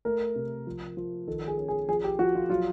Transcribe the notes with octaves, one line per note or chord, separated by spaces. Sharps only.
A3 A#4
C3
F3
F3
D#3 A4
G#4
C#4
G#4
F3 G#4
G4
F3 F#4
F4
F#3 F4